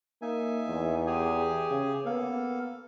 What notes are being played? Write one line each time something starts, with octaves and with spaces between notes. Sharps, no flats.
A#3 D#4 E5 G#5
E2
G4 G#4 G#5
C#3
A#3 B3 A4 F5